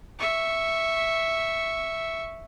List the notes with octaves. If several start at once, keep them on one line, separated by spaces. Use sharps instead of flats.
E5 C#6